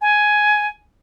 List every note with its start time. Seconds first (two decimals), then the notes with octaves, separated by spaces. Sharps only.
0.02 G#5